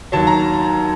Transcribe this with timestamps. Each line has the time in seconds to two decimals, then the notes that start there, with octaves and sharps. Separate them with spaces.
0.12 D#2 D#3 F#3 A5
0.27 A#5